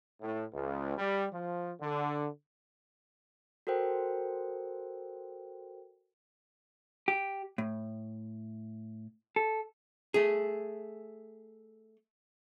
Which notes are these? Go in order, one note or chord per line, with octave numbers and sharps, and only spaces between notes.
A2
C#2
G3
F3
D3
F#4 A4 A#4 C5 G5
G4
A2
A4
A3 G#4